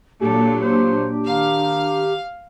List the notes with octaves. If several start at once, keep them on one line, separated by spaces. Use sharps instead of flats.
A#2 F#3 D4 G4 A4
C5
D#3 F5